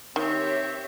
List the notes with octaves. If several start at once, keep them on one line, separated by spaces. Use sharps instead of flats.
D#3 C4 G4 C#5 E5